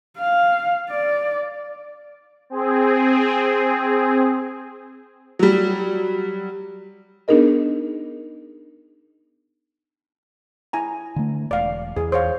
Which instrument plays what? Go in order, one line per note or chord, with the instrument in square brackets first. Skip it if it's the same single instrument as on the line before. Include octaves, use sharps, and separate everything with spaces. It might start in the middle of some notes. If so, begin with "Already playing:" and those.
[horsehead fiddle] F5
D5
[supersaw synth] C4 G#4
[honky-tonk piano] F#3 G3
[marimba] B3 D4 D#4 G#4 A#4 D#5
[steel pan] E4 G#5 A#5
[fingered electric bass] D3 A3
[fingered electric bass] E1 [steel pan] D5 F5
[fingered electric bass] E2 [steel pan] G#4
[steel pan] C5 C#5 F5